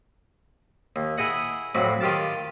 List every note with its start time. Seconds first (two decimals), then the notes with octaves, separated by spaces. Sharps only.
0.96 D#2
1.17 E4 G#4 D#5 F#5
1.75 F2 A2 F#3 B5
2.01 D#3 F4 G4 F5 A5